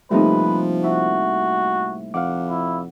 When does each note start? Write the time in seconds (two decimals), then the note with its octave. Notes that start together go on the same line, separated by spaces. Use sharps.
0.11 A2 C3 F3 G3 A3 A#3 D#4 B4
0.84 E4 F#4
2.14 F2 F5 F#5 D6
2.49 E4